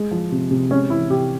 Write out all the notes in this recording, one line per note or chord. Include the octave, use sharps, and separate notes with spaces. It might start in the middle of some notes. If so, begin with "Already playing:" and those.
Already playing: G#3
F3
C3
C3
G#3 C#4
E3 E4
C3 G4